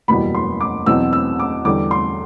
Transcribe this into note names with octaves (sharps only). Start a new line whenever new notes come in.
F#1 E2 B2 G3 B5
C6
D6
E2 B2 F#3 C4 E6
E6
D6
E2 D3 G3 D6
C6